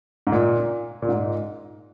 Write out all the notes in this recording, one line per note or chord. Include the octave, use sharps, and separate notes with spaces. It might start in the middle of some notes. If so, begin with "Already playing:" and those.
G#2
A#2
A#2
G#2